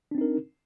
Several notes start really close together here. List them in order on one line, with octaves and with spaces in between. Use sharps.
D4 C4 D#4 A#4